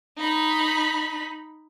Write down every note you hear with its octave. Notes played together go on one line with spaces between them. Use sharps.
D#4 B5